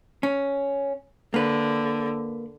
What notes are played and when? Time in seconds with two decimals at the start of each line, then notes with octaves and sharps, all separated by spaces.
0.23 C#4
1.34 D3 A#3 B4